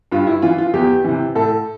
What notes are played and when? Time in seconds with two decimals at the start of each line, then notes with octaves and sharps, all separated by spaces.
0.12 G2 F4
0.27 E4
0.42 E3 F4
0.58 F4
0.73 E2 G4
1.04 C3 E3
1.35 A2 A4